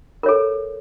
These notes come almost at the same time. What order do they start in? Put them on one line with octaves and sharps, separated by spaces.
A#4 C#5 A4